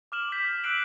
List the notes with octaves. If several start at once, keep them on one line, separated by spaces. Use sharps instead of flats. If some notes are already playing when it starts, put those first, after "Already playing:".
D6 F6 E7 F#7
F6 G6 B6
E6 F#6 B6 C7 D7 F#7